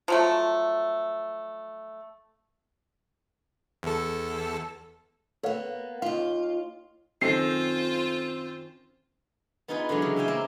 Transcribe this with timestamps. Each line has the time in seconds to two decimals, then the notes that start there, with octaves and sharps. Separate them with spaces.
0.08 F3 F#3 A3
3.83 E2 A4
5.43 A#3 B3 A4 C#5 F5
6.02 D#2 F4 F5
7.21 F#2 D#3 C4 F4 A4 C5 A#6 C7
9.68 B3 D#4 F4 G#4 B4
9.89 D3 E3 F#3 G#3
10.02 C#3
10.16 G4 E5 F5 G5 G#5
10.28 A#3 C4 A#4